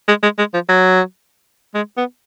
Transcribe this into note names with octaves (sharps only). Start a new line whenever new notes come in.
G#3
G#3
G#3
F3
F#3
G#3
B3